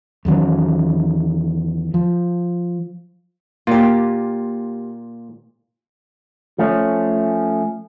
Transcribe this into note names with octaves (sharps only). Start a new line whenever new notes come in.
E2 D#3 F#3 C#4
F3
A#2 A#3 F4 G4
F3 A3 C#4